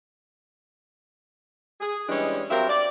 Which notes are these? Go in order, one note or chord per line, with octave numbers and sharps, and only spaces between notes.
G#4
E3 G3 G#3 C#4 D4 D#5
F#3 C4 G4 A#4 E5 F5
D5